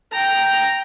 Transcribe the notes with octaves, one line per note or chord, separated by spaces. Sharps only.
G5 A#5